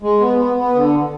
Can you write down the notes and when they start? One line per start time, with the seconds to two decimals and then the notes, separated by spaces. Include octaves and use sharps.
0.02 G#3
0.21 B3
0.38 B3
0.57 B3
0.75 D3